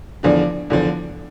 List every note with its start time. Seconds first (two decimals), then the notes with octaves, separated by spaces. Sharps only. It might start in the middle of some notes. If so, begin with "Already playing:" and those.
0.23 E2 D3 F3 D4
0.70 E2 D3 F3